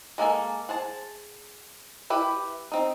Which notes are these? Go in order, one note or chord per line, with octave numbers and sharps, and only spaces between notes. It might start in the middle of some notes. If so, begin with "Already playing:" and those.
G#3 A#3 A4 G#5
G#4 C5 A5
E4 G4 B4
C4 D#4